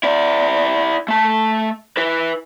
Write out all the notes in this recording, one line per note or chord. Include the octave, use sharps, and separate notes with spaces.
E4 D5
A3 A5
E4 B4